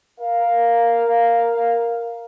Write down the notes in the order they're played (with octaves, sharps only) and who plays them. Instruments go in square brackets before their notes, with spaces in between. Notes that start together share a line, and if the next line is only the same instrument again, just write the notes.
[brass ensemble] A#4 F5